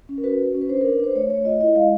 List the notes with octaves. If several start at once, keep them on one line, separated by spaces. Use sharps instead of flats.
C#4
A#4
F#4 B4
F#4
C#4
B4
D4 C5
A#4
D4
B4
D4 C5
A3 C#5
A3 C#5
F4 D#5
E4 D#5
G#3 F5